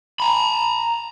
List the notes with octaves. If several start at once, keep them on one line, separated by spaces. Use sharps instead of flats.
A#5 B5